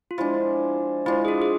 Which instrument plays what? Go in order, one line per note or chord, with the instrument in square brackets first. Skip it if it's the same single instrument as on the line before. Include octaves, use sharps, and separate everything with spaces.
[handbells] F4
[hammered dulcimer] F3 G#3 D4 [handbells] E4
[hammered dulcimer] F3 G#3 D4 [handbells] E4
[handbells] G#4
F4
G#4